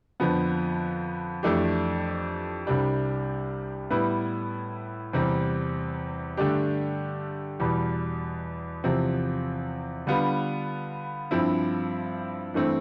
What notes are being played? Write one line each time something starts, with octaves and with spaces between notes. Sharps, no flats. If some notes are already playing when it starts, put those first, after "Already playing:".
F2 D3 F3 B3
F2 E3 A3 D4 G4
C2 C3 G3 D4 G4
A2 G3 B3 E4 B4
E2 C3 G3 C4
G2 D3 A3 D4 G4
E2 B2 G3
E2 C3 F3 C4
D3 G3 B3 F4
G2 F3 C4 E4
G2 E3 A3 C4